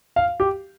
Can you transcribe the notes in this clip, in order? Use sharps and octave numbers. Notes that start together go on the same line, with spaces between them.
F5
G4